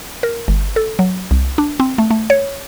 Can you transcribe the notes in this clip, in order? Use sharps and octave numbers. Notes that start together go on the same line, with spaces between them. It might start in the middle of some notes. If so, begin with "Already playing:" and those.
A#4
G1
A4
F#3
C2
D4
C4
A3
A3
C#5